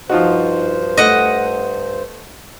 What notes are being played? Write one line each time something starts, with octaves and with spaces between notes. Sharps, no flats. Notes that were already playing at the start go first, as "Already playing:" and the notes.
G2 F3 D#4 F4 F#4 C5
A3 D#5 F#5